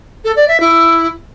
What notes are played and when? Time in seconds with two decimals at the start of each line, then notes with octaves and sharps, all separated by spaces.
0.25 A4
0.36 D5
0.48 E5
0.60 E4